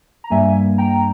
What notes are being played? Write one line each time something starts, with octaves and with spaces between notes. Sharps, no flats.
A#5
G2 G3 A#3 E5 G#5
G5 A#5